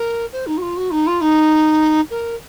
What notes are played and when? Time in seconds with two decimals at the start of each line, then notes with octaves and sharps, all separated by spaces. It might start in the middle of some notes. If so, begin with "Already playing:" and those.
Already playing: A#4
0.32 C5
0.46 D#4
0.57 F#4
0.62 F4
0.76 F#4
0.91 D#4
1.06 F4
1.21 D#4
2.10 A#4